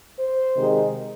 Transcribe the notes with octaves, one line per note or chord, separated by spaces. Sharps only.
C5
C3 D#3 G#3